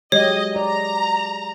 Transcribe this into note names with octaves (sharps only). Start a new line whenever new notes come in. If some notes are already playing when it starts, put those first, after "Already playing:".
F#3 G#3 G4 C#5 D#5
D5 A#5